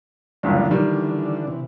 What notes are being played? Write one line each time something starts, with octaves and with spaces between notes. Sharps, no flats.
F#1 C#2 G2 D3 E3 D4
D#3 G3
C3 E3